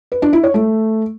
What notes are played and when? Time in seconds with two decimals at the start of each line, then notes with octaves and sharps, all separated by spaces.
0.12 B4
0.22 D4
0.33 E4
0.43 C#5
0.54 A3